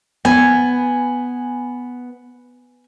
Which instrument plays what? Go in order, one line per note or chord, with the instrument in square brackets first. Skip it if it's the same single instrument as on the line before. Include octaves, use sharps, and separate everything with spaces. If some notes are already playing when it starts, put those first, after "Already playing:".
[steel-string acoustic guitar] B3 [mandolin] G#5